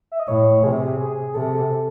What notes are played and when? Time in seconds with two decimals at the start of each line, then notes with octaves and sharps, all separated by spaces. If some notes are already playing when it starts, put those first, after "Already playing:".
0.12 E5
0.19 D#5
0.28 A2 C#5
0.64 C3 G#4
0.99 G#4
1.34 C3 A4